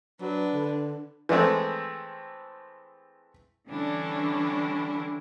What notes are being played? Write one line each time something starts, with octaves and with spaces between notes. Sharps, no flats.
F#3 D4 B4
D3
E3 G#3 A3 C4
D3 E3 G3 C#4 D4 E4